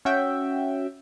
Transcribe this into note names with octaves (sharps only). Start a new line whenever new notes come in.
C#4 F#4 E5 G5